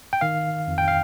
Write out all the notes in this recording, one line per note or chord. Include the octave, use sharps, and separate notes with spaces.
G5
D#3 F5
F2
G5
F5